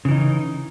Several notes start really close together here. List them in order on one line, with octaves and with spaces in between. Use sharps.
C#3 E3 D#4